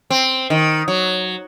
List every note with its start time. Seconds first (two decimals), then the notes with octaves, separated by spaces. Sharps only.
0.10 C4
0.50 D#3
0.88 F#3